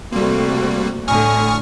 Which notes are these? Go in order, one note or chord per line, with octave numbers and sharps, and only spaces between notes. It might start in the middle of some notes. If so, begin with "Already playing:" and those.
C3 G3 A3 A#3 C4 F#4
A2 D3 G#5 C#6 D#6 F6